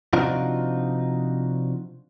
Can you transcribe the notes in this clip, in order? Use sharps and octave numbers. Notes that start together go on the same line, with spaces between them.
C3 F3 D4 D#4 F4 F#4